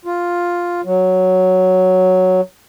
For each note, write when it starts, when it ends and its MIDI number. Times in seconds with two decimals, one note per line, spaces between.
0.05 0.81 65
0.85 2.41 54